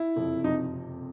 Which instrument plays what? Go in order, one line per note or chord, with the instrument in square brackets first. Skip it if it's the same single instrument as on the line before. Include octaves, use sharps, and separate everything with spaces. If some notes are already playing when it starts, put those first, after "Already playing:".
Already playing: [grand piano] E4
[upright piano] F#1 F2 C3 F3
[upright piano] C3 F3 [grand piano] D#4